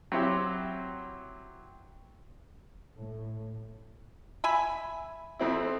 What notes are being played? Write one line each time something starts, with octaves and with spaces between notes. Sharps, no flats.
F#3 C4 E4 G4
A2
E5 G#5 B5
F2 C4 E4